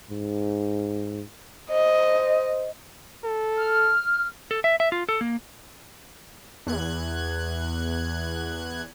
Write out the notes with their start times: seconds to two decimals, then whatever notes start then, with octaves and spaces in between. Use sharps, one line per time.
0.11 G#2
1.71 C5 D#5
3.24 A4
3.59 F6
4.51 A4
4.64 E5
4.80 E5
4.92 F4
5.09 A4
5.21 A#3
6.67 E2 F#6 G#6